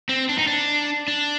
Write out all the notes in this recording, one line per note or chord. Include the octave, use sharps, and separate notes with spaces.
C4
D4
D#4
D4
D4